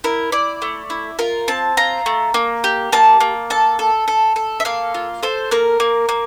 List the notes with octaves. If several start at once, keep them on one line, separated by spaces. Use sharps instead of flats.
E4 A#4
E4 D5
A3
E4
F4 A#4
C4 A5
F4 A#5
A3
A#3
G4
A#3 A5
A#3
A4 A5
A4
A4
A4
E5
A#3 F5
F4
A4 C5
A#3 A#4
A#3
A#3